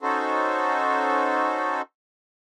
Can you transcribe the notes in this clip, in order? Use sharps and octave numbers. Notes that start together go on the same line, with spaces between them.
C#4 D#4 F#4 A4 C5